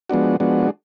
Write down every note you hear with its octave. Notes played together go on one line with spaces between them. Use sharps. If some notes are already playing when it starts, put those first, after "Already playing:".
F3 G#3 B3 D4 F#4
F3 G#3 B3 D4 F#4